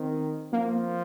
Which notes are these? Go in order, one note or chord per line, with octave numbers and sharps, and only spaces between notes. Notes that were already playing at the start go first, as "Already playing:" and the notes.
Already playing: D#3 C4
F3 A#3